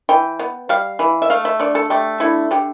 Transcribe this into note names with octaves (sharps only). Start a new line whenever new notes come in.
E3 G5
B3
G3 F5
E3
E5
A3 F5
E5
D3 D5
A4
A3 G4
D3 E4
D3 G4